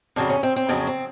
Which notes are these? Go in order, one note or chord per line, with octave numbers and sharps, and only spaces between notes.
F2 C#3 F#3 D4
C#4
C4
C4
F2 C#3 F#3 B3
C4